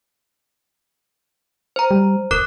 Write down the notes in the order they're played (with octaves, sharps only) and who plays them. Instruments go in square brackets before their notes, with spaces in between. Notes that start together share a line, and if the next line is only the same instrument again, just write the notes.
[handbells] C5 A#5
[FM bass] G3
[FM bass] D#1 [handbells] A#4 D6 F#6